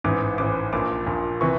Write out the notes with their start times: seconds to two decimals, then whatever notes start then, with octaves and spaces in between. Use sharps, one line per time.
0.04 A1 G#2 E3 D6
0.38 A1 G#2 E3 D6
0.73 A#1 A#2 D6
1.06 A#1 A#2
1.41 C3 E3 C#6